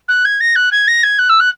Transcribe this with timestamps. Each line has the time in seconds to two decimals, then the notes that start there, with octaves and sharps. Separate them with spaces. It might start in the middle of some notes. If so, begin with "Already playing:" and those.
0.08 F#6
0.25 G#6
0.41 A#6
0.56 F#6
0.72 G#6
0.88 A#6
1.03 G#6
1.19 F#6
1.29 E6
1.40 F#6